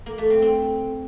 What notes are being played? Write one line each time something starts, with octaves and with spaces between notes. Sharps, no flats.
A#3
A3
C4
C4